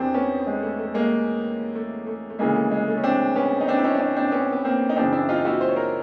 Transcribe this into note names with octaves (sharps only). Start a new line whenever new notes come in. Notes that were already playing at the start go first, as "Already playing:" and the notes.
Already playing: E2 C3 D#3 C4 D4
B3 C#4
G#3
A3
A3
G#3 A#3
A3
A3
A3
D2 C#3 E3 G#3 A#3
A3
G#3
A3
C#4
C4 D4
B3 C#4
D#4
C4 D4
E4
C#4 D#4
D4
C#4 D#4
C4 D4
D4
B3 C#4
B3
A#3 C4
D#4
F#2 C#3 E3 C4 D4
D4 E4
D#4 F4
E4 F#4
C5
C#5
A#4 C5